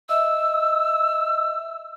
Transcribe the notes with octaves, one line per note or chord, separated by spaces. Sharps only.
D#5 E5 E6